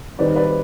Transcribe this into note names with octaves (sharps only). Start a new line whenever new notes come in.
D#3 G3 C4 D#4 B4 D5
B4 D5